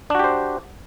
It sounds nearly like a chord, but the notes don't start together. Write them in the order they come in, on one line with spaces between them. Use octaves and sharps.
D4 F#4 G4 C5